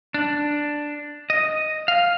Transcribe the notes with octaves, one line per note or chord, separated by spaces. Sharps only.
D4
D#5
F5